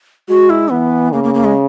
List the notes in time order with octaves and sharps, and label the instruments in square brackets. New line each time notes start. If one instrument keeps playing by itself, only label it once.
[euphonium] G#3 [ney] F#4
[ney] E4
[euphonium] E3 [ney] B3
[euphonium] C#3 [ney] A#3
[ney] A#3
A#3
G#3